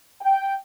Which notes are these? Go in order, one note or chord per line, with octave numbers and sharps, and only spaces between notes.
G5